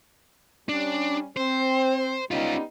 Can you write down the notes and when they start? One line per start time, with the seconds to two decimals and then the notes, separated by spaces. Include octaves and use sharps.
0.69 G3 C#4 D4
1.37 C4 C5
2.31 G3 B3 C#4 D#4 F4